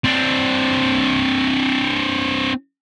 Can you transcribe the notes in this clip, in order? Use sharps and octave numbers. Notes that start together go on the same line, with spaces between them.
C4 D4